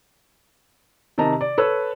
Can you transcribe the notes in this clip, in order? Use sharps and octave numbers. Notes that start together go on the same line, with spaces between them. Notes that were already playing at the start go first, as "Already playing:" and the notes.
C3 D#3 D#5 A5 A#5
D5
A4 B4 C#5 E6